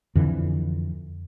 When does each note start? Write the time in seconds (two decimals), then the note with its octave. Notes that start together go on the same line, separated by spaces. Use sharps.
0.15 F2 D3 E3